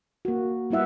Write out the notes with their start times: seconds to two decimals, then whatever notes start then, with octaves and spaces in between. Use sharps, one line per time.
0.25 A#3 F#4
0.71 G3 B3 E4 E5 F#5